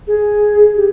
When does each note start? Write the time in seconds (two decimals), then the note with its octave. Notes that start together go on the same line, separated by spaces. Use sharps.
0.07 G#4
0.77 G4